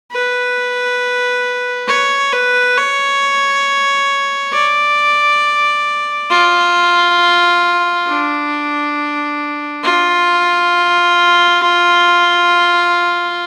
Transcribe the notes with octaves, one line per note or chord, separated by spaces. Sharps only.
B4
C#5
B4
C#5
D5
F4
D4
F4